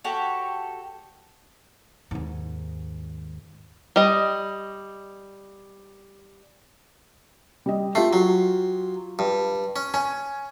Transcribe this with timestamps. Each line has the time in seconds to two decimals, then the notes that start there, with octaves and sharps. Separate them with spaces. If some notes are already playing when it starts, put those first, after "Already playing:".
0.04 F#4 G4 A4 C#5
2.11 D#2 G#2
3.96 G3 D#5
7.66 G3 D#5
7.95 A3 F4 G4 C7
8.13 F#3
9.19 G2
9.76 C#4
9.94 C#4 G#5